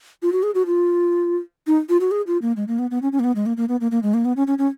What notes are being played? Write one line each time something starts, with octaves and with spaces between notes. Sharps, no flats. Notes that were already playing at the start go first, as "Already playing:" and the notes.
F4
F#4
G#4
F#4
F4
D#4
F4
F#4
G#4
F4
A#3
G#3
A#3
B3
B3
C#4
C#4
A#3
B3
G#3
A#3
A#3
B3
A#3
A#3
G#3
A#3
B3
C#4
C#4
C#4